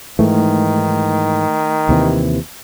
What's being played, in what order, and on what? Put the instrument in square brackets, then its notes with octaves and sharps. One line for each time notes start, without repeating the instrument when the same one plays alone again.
[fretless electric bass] G#2 E3 [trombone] D#3 [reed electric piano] A3
[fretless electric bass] D#2 C3 E3